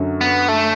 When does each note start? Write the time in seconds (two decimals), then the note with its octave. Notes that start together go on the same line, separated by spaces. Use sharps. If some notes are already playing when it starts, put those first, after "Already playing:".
Already playing: F#2 D3 F#3
0.21 B3
0.48 A3